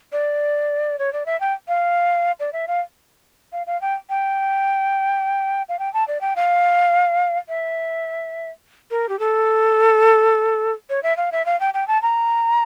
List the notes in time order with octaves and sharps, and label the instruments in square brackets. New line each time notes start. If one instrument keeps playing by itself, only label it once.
[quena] D5
C#5
D5
E5
G5
F5
D5
E5
F5
F5
F5
G5
G5
F5
G5
A5
D5
G5
F5
E5
A#4
G4
A4
C#5
E5
F5
E5
F5
G5
G5
A5
A#5